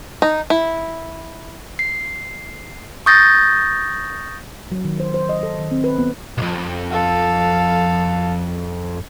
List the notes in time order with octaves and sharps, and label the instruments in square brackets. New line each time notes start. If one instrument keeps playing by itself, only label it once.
[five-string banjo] D#4
E4
[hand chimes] C7
C#6 D#6 G6 A6 A#6
[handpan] F#3
D#3
C5
C5
D#5
A4
D#3
C4
B4
B3
[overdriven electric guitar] B1 F2
[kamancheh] A4 F5